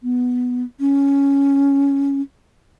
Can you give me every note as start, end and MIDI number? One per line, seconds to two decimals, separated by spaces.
0.03 0.63 59
0.80 2.21 61